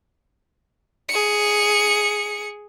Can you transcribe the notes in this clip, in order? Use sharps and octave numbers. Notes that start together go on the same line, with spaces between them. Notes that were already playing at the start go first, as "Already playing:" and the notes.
G#4 C#7